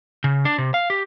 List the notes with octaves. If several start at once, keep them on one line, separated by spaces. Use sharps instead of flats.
C#3
D4
C3
F5
G4